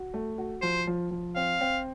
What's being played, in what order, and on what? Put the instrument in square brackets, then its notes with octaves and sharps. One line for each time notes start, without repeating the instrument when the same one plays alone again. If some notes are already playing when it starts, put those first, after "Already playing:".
Already playing: [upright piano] F#4
A3
F#4
[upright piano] F3 [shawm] C5
[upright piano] F3
F3
[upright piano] C4 [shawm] F5
[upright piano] C4